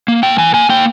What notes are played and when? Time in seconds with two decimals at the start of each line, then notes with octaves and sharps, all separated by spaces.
0.08 A#3
0.23 A#3 G5
0.38 E3 G#5
0.54 A#3 G#5
0.69 A#3 G5